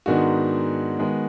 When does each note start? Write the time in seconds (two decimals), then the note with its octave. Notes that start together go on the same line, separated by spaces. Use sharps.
0.06 G#2 D#3 G#3 B3 D4 F#4
0.99 D#3 G#3 B3